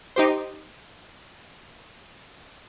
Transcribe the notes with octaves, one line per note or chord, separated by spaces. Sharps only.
D#4 G4 C5